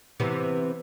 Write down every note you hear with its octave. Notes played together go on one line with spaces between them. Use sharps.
C3 E3 B3